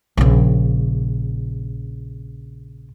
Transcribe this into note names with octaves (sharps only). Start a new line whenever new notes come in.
A#1 C#3